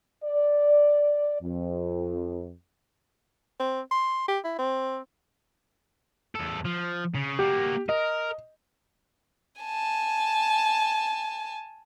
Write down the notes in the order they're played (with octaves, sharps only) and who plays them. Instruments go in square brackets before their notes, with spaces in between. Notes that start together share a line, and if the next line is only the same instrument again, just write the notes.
[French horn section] D5
F2
[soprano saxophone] C4
C6
G4
E4
C4
[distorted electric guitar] E2 A4
F3
C#3
[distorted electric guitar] A#3 F#4 [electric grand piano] G4
[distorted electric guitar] A#4 [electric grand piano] D#5
[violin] G#5 A5